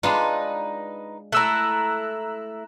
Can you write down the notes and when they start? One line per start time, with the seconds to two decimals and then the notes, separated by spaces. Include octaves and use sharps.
0.03 G#3 D4 D#4 F4 B4
1.32 A3 E4 A#5 E6 F#6